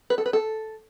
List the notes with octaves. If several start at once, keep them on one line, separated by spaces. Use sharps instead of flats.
B4
A4
B4
A4